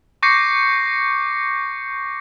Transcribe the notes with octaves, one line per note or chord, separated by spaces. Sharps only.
C#6 D6 G6 A#6 C7 C#7